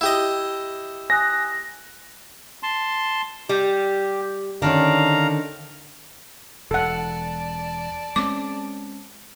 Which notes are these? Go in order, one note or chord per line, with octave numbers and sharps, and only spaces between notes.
E4 G4 D#5
G#5 D#6 F#6 A#6
A5 C6
G3 G4
D3 D#3 C#4 D4 F5 A#5
E1 A4 D5 F#5 A5
G#3 C4 C#4 D6